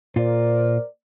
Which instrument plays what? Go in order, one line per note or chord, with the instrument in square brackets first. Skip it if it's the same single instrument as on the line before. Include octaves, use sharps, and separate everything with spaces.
[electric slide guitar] A#2 F4 [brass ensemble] A#4 C5 D5